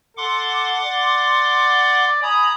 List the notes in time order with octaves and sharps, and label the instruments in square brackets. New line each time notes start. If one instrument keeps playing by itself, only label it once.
[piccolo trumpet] A4 [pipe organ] F#5 C6 D6
[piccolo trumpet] D5
[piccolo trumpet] G#5 [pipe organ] A#5 B5 D#6